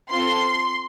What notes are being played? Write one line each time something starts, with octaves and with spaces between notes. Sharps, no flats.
C4 F4 A4 C6